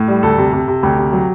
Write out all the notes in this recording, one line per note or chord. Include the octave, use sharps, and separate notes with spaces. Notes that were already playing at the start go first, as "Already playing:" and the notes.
Already playing: A2
G3
D2 A4
C3
C3
C3
D2 G4
C3
F#3